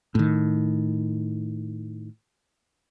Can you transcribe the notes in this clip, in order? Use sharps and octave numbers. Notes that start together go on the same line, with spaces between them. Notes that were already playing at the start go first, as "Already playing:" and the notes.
A2 D#3